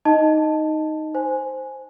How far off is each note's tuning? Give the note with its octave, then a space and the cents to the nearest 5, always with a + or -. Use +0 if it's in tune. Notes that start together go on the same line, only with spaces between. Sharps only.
D#4 +0 D#5 +0 A5 +0
C5 +0 G#5 +0